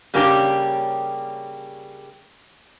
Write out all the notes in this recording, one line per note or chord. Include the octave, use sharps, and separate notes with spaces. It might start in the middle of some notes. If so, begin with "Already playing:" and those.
C#3 G3 A#3 C#4 D4 G4